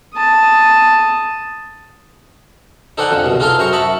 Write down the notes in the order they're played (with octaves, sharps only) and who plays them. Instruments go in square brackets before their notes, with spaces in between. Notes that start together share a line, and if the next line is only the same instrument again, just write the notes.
[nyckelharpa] A5 D#6
[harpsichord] D#4 A4 C5 D5 F#5 G#5
F2 D3
C2 B2
D#4 F4 G#4 A4 F5 C6
F#2 C5 A#5 C#6
D#5 E5 A5 B5 C#6